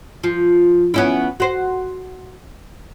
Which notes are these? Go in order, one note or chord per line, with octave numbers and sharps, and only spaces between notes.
F3
B3 C#4 E4
F#4 C5